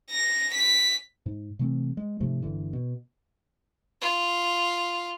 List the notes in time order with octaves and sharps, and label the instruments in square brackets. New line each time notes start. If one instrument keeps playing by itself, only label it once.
[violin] A#6
B6
[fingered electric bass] G#2
C3 E3 A3 C4
G#3
G#2 C3 F3 A3
G1 D3 E3
B2
[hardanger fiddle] F4